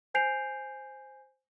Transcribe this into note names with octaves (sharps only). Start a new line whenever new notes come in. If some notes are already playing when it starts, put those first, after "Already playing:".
C5 G#5 G6 C7 D7 F7